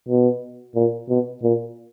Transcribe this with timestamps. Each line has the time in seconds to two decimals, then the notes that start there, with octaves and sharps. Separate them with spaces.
0.08 B2
0.75 A#2
1.09 B2
1.43 A#2